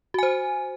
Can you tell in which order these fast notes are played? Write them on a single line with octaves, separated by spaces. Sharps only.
F#4 G#5 C5